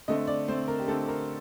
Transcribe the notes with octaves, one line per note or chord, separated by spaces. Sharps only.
D3 A3 C4 D#5
D5
D3 A3 C4 C5
A#4
G4
D3 A3 C4 A4
A#4